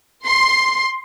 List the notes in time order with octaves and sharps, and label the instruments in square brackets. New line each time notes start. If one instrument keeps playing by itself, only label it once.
[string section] C6